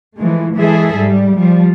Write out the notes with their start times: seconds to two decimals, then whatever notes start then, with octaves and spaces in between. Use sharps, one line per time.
0.17 E3 F3 G#3 A3
0.57 E3 G#3 G#4 A4 E5
0.97 G#2 G3
1.37 F3 G3